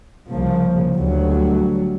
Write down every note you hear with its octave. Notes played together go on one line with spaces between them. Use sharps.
C2 C#3 F3 A#3
D2 F#3 G3